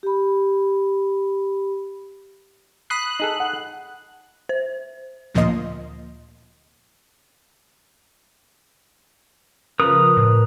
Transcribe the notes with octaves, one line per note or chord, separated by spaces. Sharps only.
G4 B5
B5 D#6 F#6 C7
D#4 G#4 A4
F#5
C5
D2 A#2 F3 A#3 D#5 C6
C#3 F3 A#4 B4 D#6
A2